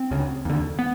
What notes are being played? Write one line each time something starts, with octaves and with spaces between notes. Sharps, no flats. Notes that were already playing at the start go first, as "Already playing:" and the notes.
Already playing: C4
D2 C#3
D#2 D3
B3